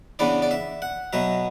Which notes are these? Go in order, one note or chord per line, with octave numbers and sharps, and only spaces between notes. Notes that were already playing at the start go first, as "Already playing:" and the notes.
C#3 E3 B3 D4 D5
D5
E5
F#5
B2 F#3 B3 E5